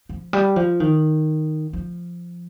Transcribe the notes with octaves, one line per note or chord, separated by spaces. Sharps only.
F3
G3
F3
D#3
F3